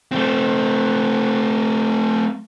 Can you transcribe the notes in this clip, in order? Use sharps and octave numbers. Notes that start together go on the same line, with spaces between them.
A3 C4